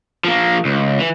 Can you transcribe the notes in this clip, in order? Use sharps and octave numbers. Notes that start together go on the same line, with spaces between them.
F3 A#3
C#2
E3